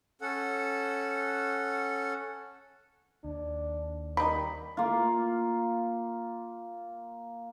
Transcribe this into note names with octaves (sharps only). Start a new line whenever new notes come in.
C#4 A4 F#5
D#2 D4
G3 A#3 D#4 B5
A#3 F4